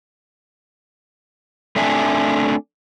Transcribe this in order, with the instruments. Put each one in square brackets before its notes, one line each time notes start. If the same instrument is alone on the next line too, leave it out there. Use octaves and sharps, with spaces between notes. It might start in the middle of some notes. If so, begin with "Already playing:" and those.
[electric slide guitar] A3 C4 D4 E5 G#5